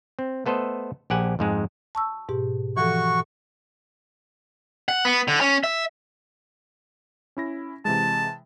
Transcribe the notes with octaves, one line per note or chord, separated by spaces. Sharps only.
C4
A3 B3 A4 C5 D#5
A#1 G4 F#5 G#5
F2 G#2 G#3
A5 C#6 E6
G#2 B2 G4
E3 F3 F#4 A4 C#6
F#5
B3
D3
C#4
E5
C#4 E4 A#6
C3 E3 G#3 A5